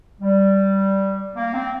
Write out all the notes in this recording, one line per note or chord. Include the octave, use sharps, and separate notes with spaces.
G3
A#3
C4